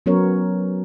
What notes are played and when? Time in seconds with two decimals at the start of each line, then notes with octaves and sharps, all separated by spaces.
0.06 F#3 B3 C#4 A#4 C#5